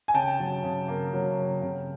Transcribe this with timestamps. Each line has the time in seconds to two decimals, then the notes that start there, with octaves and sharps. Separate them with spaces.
0.08 G#5
0.14 C#3 G5 A5
0.40 F#3
0.63 C#3
0.88 A#3
1.13 F#3
1.39 C#3
1.62 C#3